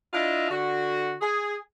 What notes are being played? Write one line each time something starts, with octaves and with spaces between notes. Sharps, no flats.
D4 E4 F4 D#5 E5
D3 F#4
G#4